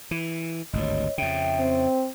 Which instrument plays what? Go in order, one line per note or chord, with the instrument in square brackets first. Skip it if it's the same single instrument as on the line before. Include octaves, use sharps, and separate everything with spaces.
[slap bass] E3
[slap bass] G#1 D2 G2 [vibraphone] C#5 D#5
[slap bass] F2 C#3 [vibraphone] E5 G5
[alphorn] C4